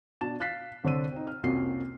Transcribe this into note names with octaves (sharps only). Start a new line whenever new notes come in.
B2 D4 A5 A6 E7
F5 F#6 A6 B6 C7
C2 D3 C5 C#5 E6 D#7
C4 D#4
F6
C2 F2 A#3 C#4 F#4 C7